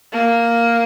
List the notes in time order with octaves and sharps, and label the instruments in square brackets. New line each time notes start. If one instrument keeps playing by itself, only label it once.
[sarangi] A#3